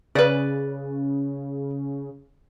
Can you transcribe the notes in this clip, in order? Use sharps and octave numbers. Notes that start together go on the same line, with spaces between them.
C#3 B4 D5